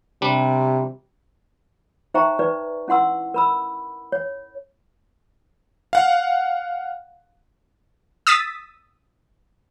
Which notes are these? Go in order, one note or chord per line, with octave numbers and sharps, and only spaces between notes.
C3 G3 D4
D#4 C5 E5 G5 A#5 C#6
D#4 B4 D5
C#4 E4 F#5 C6 E6
A#4 B5 E6
C#5
F5 F#5
D#6 E6 A6 B6